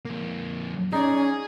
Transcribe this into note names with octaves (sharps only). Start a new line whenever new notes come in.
F2 A#3
C#4 D#4 G#4 D5